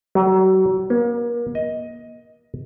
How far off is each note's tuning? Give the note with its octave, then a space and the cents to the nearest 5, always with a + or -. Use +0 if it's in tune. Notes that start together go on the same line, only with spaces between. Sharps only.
F#3 +35
A#3 +35
D#5 +15